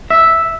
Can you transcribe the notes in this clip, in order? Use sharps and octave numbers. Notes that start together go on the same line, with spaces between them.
E5